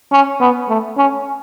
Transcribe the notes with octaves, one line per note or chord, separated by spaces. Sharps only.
C#4
B3
A3
C#4